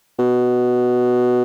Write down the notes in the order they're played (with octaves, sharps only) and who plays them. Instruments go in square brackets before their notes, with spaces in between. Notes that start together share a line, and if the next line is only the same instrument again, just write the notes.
[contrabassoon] B2